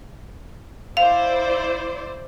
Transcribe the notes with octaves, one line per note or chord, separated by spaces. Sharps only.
E4 C5 D5 F5